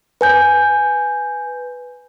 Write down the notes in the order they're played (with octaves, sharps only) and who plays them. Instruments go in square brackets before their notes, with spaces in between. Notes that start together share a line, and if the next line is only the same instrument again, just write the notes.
[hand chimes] B4 G#5 G6